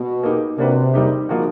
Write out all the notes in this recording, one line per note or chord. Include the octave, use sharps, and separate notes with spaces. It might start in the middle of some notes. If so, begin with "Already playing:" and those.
Already playing: B2
A#3 D#4 G4
C3 A#3 D4 F#4 B4
G3 A#3 D#4 G4
F3 A#3 D#4 F#4